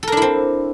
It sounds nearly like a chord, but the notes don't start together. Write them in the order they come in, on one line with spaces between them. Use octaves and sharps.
A4 A#4 D4 E4 C4